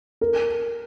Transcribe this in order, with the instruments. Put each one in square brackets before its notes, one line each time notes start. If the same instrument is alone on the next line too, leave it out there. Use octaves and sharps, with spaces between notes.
[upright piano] A#4